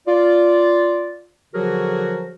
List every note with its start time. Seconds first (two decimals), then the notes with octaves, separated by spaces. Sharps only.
0.07 F4 D5
1.54 D3 F3 F#3 F#4 G#4 A#4